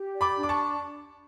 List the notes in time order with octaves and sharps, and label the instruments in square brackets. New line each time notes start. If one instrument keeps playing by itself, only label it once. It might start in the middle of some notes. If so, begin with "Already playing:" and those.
Already playing: [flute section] G4
D5
[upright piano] B5 D6
[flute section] D4
[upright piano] D6
A5 C#6